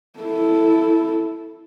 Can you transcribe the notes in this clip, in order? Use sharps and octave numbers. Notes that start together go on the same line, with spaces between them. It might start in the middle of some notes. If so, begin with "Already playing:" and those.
E4 A4